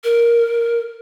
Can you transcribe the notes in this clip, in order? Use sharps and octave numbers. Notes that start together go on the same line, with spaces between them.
A#4